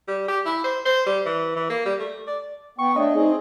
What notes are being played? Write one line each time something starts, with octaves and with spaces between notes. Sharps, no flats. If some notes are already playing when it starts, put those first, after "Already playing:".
G3
G4
E4
C5
C5
G3
E3
E3
A#3
G3
A3
D5
B3 G5 C#6
A3 D4 C#5 D#5
C4 D#4 G#4